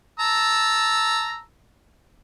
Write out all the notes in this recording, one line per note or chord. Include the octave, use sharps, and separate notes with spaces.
A5 A#5 E6